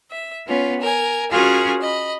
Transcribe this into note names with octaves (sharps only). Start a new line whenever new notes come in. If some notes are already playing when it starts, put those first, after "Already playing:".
E5
B3 C#4 F4
A#4 G#5
C#4 F4 F#4 G#4 A#4
D#5 B5